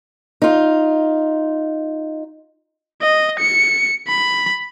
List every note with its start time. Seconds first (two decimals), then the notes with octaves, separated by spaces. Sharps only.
0.42 D#4 F4
3.02 D#5
3.39 C#7
4.08 B5